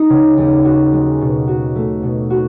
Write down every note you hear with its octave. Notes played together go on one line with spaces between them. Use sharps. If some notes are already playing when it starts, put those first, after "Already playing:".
Already playing: D#4
C#3
D#2
F#4
G#3
B2
F#4
A3
B2
F#4